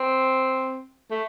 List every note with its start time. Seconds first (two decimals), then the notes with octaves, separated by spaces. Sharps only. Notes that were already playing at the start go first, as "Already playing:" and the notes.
Already playing: C4
1.11 A3